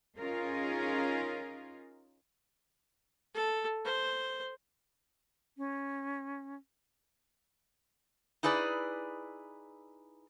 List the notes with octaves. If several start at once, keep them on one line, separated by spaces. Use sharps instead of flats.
C#4 D#4 F4 G#4 A#4
A4
C5
C#4
D#4 E4 G#4 B4 D5